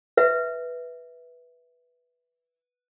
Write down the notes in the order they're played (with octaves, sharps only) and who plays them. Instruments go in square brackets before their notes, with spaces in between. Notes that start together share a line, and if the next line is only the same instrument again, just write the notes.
[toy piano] B4 E5